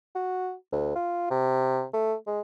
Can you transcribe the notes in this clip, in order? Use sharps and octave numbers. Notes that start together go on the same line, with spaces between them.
F#4
D2
F4
C3
A3
G#3